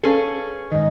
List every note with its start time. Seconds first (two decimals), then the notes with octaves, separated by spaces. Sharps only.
0.03 C#4 G#4 A4 B4 F5
0.72 G#2 D#3 D#5